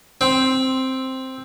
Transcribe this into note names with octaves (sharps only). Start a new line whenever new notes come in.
C4